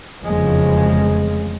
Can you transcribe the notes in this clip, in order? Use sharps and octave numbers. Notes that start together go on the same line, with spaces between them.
F1 E2 C#3 F3 G#3